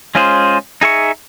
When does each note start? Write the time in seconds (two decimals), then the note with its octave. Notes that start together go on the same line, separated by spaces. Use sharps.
0.15 G#3 C#4 F4 G#4 C5
0.81 D#4 G#4 E5 C#6